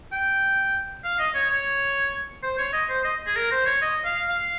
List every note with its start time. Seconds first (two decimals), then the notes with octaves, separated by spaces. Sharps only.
0.12 G5
1.04 F5
1.19 D#5
1.35 C#5
1.50 C#5
2.43 C5
2.58 C#5
2.73 D#5
2.89 C5
3.04 D#5
3.26 G#4
3.36 A#4
3.51 C5
3.66 C#5
3.81 D#5
4.05 F5
4.29 F5